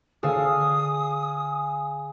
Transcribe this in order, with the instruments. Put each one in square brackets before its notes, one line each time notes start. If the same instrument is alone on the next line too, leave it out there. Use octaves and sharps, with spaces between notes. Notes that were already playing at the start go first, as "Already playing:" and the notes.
[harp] D3 E6 [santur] G#4 F5 G#5 [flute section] D#6